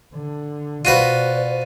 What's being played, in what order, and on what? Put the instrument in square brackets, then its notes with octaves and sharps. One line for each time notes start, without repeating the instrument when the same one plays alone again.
[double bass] D3
[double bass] B2 [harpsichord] F4 F#4 B4 [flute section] C5 D5 [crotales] D#7